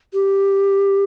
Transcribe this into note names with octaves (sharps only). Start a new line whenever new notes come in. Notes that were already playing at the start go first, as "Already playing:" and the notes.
G4